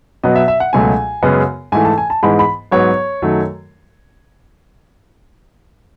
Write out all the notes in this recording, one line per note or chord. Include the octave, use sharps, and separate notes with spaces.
B2 F#3 B3 D#5
E5
E5
F#5
C#2 B2 F#3 A3 G#5
F#2 C#3 G#3 B3
G#2 E3 A3 G#5
A5
G#5
A5
G#2 E3 G#3 B3 B5
B5
G#2 F#3 B3 C#5
F#2 D#3 F#3 A3